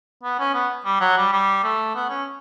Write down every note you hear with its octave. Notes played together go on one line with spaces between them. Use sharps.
B3
C#4
B3
G3
F#3
G3
G3
A3
B3
C#4